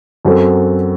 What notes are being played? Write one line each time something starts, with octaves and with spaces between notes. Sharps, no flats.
F#2 F#3 C4 F#4 A4